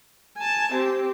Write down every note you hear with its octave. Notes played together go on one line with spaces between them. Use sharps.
G#5 A5
C4 G4